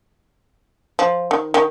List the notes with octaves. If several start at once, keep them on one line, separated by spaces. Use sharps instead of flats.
F3
D#3
D#3